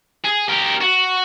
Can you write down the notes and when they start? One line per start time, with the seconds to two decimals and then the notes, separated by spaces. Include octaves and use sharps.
0.24 G#4
0.48 G4 A#4
0.81 F#4